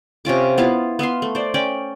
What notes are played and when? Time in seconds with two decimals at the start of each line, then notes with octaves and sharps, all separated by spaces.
0.25 C3 C#4 F4 D6
0.58 B3 E4 F4 F5
0.99 B3 E5 F5 C6
1.22 A3
1.35 C5 D5
1.54 C#4 D5 G5